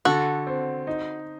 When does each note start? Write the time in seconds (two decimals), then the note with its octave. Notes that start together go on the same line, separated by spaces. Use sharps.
0.05 D3 F#4 A4
0.47 C4
0.87 D#4